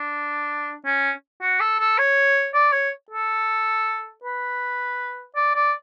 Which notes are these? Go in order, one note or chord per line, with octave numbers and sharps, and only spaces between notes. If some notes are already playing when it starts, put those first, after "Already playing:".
Already playing: D4
C#4
F#4
A4
A4
C#5
D5
C#5
A4
B4
D5
D5